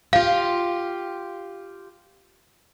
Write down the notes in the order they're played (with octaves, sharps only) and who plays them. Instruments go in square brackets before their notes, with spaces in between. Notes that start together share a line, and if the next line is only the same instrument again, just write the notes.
[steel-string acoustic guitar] F4 G4 [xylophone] F5